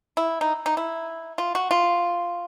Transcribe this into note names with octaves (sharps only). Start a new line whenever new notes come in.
E4
D#4
D#4
E4
F4
F#4
F4